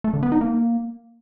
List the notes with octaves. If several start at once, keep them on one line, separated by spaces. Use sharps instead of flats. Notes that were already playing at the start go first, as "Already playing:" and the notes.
A3
D3
B3
D#4
A#3